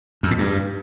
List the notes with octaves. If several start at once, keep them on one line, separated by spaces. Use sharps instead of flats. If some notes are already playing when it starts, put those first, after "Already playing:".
F2
A2
G2